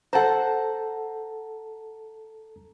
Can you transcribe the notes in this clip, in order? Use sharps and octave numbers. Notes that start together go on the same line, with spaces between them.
A4 C5 F#5 A5 A#5